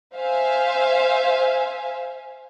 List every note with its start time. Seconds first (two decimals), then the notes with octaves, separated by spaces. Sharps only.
0.16 C5 E5 F5 G#5